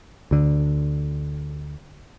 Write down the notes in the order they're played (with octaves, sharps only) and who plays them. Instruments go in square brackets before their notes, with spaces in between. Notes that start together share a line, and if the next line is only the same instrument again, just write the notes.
[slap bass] D2 D3